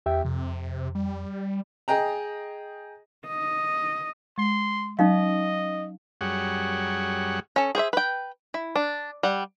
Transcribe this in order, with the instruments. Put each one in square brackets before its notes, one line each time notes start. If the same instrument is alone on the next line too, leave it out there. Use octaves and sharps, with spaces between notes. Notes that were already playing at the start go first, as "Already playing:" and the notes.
[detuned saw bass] E2 [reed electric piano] G4 E5 G5
[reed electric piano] F2 [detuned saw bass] C3
[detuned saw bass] G3
[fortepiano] G#4 D#5 G5 A#5
[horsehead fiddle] D#5
[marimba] G#3 [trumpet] C6
[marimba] F#3 [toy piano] C#4 D#4 F5 [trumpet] D#5
[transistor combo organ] F#2 G3 G#4 C#5 F#5
[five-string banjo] C#4 A4
G#4 C5 C#5 E5
B4 G5
E4
D4
G3 F#5